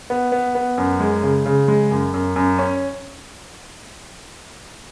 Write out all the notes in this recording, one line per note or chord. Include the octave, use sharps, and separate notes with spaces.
B3
B3
B3
F#2
G#3
C#3
C#3
G#3
F#2
F#2
F#2
C#4